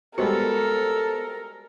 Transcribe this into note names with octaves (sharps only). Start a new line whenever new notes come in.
G3 G#3 B3 F#4 A4 A#4 C5 C#7